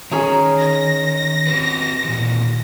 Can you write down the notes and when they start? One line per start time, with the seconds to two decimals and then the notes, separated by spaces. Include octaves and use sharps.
0.11 D#3 C#4 G#4 A#5
0.59 A#6
1.47 C4 G4 B4
2.05 A#2 D#3 E3